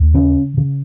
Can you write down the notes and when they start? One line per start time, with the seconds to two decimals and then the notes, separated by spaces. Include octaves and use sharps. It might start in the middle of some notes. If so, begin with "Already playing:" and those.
Already playing: D#2
0.14 C#3 C#4
0.57 C#3